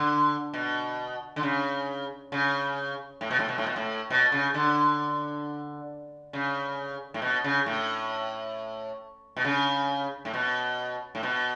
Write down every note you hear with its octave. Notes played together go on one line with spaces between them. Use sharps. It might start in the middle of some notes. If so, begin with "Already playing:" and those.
Already playing: D3
B2
D3
C#3
C#3
A2
B2
A2
B2
A2
B2
A2
B2
C#3
D3
C#3
A2
B2
C#3
A2
B2
C#3
A2
B2
A2
B2